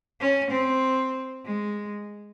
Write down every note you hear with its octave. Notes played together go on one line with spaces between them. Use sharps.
C#4
C4
G#3